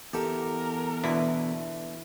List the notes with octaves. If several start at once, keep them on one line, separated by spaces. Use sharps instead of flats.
E2 G4 A4 A#4
B2 D3 E3 E4